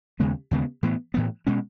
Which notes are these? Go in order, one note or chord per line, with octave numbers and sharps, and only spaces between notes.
D#2 C#3 G#3 B3
D#2 C#3 G#3 B3
A2 E3 B3
A2 E3 B3
B2 G#3 C#4